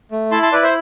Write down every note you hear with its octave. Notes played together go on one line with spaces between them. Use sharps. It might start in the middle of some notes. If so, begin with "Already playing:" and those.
A3
E4 A5 C6
A5 C6
E4 B4 D5
C5 E5